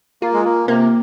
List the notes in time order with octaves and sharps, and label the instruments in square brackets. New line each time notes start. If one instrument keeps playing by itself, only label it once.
[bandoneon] A#3 [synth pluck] F4
[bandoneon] G#3
A#3
[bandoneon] C3 [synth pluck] A#3